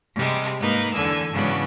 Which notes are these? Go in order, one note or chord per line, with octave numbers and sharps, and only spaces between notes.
C3 G3 G#3
G#2 A#3 D#4 A#4 B4
E2 D3 A4 G#5 E6
G#2 C#3 E3 F#3 B3 D4